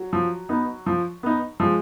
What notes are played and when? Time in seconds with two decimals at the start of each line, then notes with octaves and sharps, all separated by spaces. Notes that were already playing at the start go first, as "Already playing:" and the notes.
Already playing: F#3
0.13 F3
0.49 B3 D#4
0.86 F3
1.23 B3 D#4
1.60 F3 G#3